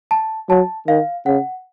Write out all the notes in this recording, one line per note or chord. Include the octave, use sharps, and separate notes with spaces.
A5
F#3 A5
D#3 F5
C#3 F#5